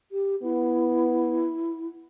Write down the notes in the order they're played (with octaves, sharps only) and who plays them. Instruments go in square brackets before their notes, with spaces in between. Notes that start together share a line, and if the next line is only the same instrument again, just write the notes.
[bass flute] G4
[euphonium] B3 [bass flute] E4